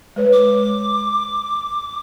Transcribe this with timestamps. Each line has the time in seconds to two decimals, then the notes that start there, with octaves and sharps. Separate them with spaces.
0.16 G#3 B4 C#5
0.33 D6